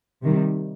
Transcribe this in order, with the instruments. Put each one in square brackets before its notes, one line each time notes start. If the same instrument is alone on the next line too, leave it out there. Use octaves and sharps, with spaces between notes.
[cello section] C3 D#3 G3